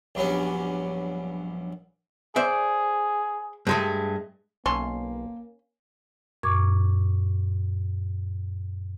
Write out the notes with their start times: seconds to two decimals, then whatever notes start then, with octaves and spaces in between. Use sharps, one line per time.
0.15 A#1 G2 F#3 B3 C#4
2.36 G#4 C5 D5 E5
3.67 G2 G#3 A3
4.66 B1 A#3 C#4 A4 C6
6.43 F#2 A#2 C#6 D6 G#6